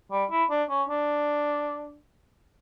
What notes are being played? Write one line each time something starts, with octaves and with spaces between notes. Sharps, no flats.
G3
E4
D4
C#4
D4